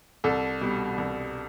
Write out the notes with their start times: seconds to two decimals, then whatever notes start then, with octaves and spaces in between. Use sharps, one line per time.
0.24 C2 A4
0.61 B2 G3
0.98 C2